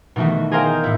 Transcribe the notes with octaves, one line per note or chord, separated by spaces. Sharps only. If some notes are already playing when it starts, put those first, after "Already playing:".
B2 D#3 E3 A3 F#4
G#4 A#4 C5 D#5 F5 G5
A2 E4